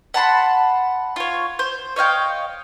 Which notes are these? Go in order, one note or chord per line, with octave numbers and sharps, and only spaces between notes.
F#5 A5 B5 C6
F4 C#5
C5
C#5 D#5 F5 G5